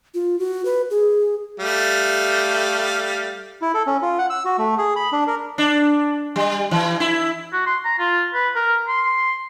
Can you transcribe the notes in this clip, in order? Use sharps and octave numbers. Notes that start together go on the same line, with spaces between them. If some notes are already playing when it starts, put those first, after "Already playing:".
F4
F#4
B4
G#4
G3 A3 F5
E4
A4
C#4
F4
F#5
E6
F#4
A3
G#4
B5
D4
A#4
D4
G3
E3
E4
F#4
C6
A#5
F4
B4
A#4
C6